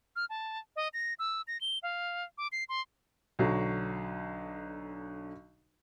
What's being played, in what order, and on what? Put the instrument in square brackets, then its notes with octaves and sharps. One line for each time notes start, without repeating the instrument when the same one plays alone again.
[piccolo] F6
A5
D#5
A#6
E6
A#6
G7
F5
D6
C7
C6
[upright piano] B1 D3 F#3